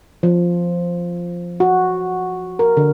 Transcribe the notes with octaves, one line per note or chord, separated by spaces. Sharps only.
F3
F#4
A#4
D3